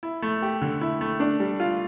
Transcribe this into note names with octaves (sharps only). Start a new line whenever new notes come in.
E4
A3
G4
D3
E4
A3
D4
G3
F4